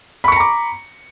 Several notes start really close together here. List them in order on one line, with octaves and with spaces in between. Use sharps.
B5 C#6 C#7 A#5 D6